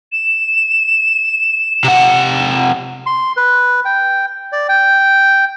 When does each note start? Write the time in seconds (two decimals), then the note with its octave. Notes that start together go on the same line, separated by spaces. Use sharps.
0.12 E7
1.84 C3 F#5
3.06 C6
3.37 B4
3.85 G5
4.52 D5
4.69 G5